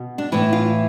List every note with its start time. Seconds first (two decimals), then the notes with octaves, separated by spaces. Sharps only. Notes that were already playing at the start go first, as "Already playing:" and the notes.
Already playing: B2
0.18 D4
0.32 A2 E3 E4
0.53 F4